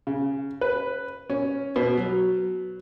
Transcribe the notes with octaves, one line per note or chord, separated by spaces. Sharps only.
C#3
B4
C#4
B2
F#3